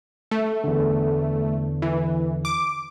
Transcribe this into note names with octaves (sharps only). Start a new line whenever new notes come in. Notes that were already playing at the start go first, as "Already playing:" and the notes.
A3
E2 D3
E3
D6